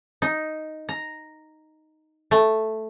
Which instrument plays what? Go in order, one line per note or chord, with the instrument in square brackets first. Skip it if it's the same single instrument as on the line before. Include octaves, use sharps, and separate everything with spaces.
[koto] D#4
A#5
A3